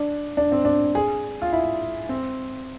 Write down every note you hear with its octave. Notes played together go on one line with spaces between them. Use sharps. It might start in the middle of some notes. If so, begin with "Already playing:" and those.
Already playing: D4
D4
C4
D4
G#4
F4
E4
C4